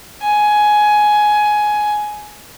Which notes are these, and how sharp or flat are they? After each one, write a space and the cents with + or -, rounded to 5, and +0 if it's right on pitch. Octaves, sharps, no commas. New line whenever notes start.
G#5 +15